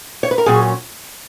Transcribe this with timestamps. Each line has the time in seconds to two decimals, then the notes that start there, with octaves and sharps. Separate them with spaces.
0.23 C#5
0.31 B4
0.38 A#4
0.46 A#2 F#3 C#4 G#4